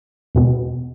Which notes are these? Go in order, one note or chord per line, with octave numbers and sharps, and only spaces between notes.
E2 B2 G#3 B3